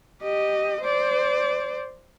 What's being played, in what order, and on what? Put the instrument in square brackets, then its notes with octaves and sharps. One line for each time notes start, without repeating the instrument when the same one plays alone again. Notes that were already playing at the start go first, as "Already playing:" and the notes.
[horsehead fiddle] G4 D#5
C5 D5